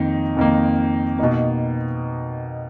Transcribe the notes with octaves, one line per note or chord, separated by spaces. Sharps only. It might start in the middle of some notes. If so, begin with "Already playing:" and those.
Already playing: F2 D#3 A#3 D#4
F2 D#3 A#3
B2 A#3 D#4